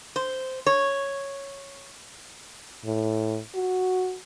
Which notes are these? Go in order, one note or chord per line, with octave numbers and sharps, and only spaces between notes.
C5
C#5
A2
F#4